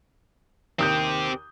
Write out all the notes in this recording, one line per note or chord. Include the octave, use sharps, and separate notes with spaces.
D#2 C4 G4 D#6 G6